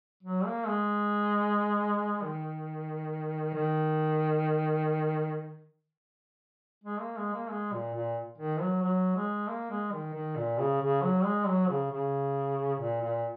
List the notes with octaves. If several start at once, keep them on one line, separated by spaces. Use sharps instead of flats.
F#3
A#3
G#3
D#3
D#3
G#3
A#3
G#3
A#3
G#3
A#2
A#2
D#3
F#3
F#3
G#3
A#3
G#3
D#3
D#3
A#2
C#3
C#3
F#3
G#3
F#3
C#3
C#3
A#2
A#2